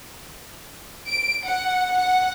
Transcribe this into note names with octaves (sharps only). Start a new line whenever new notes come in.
D7
F#5
F#5